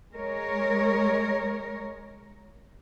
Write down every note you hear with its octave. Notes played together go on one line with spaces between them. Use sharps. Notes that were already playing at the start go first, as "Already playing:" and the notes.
G#3 A#4 C#5